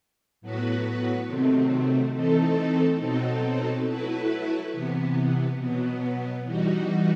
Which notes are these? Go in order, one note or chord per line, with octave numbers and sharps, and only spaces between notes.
A2 F#3 B3 F#4 B4
C3 D#3 F#3 A3 C4
E3 A3 C4 D#4 A4
B2 F#3 C4 D#4 A4
F#3 A3 E4 B4
C3 E3 B3
B2 F#3 B3
E3 G3 D#4 F#4